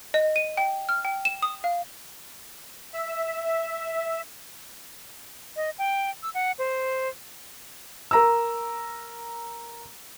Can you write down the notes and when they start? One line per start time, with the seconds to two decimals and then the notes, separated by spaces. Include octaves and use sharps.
0.14 D#5
0.36 D#7
0.57 G5
0.89 F6
1.05 G5
1.25 E7
1.42 D#6
1.64 F5
2.93 E5
5.56 D#5
5.78 G5
6.23 E6
6.34 F#5
6.59 C5
8.11 A#4 A#5 E6